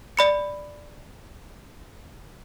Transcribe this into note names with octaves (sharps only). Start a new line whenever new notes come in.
D5 B5 C#7